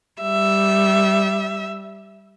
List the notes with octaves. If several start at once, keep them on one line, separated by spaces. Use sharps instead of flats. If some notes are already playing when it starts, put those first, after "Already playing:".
G3 E5